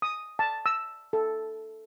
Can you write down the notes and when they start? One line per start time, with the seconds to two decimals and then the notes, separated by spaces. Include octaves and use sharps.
0.02 D#6
0.39 A5
0.66 E6
1.13 A4